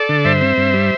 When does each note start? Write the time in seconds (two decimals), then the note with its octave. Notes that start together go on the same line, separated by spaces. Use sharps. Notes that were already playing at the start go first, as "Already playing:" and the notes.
Already playing: A4 D5
0.09 D3
0.25 G2 C5 E5
0.41 C4
0.57 G2
0.74 G3